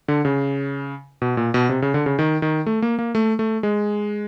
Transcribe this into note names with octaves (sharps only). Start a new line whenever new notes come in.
D3
C#3
B2
A#2
B2
C3
C#3
D3
C#3
D#3
D#3
A3
A#3
A#3
A3
A3
G#3